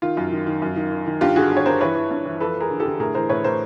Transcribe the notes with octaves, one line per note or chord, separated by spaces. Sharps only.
D#3 F4
F#2
D#3
D#3
F#2
D#3
D#3
D#3
G2 F4 G4
D3 F#4 G#4
G2
C#5
G2 A#4 C5
E3 B4 C#5
E3
G2
E3
F2 A4 B4
F2
G#4 A#4
D3
G4 A4
D3
A2 G#4 A#4
E3 A#4 C5
A2 B4 C#5
A2 A#4 C5